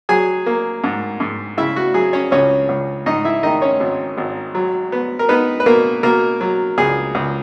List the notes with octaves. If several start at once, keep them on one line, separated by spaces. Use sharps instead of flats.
F#3 G#4 G#5
A#3
G#2
G#2
C#3 E4 E5
F#4
F#3 G#4
C#4 C#5
C#2 C#4 C#5
C#2
G#2 D#4 D#5
E4 E5
D#3 D#4 D#5
C#4 C#5
G#1
G#1
F#3
B3
A#4
B3 D#4 B4
B4
B2 A#3 A#4
B2 A#3 A#4
F#3
C#2 G#4
C#2